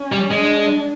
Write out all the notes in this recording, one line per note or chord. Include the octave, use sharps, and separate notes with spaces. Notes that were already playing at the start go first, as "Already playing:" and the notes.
Already playing: C#4
G3
G#3 D4